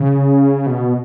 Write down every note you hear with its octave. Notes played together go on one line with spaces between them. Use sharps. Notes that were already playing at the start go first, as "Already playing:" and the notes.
Already playing: C#3
B2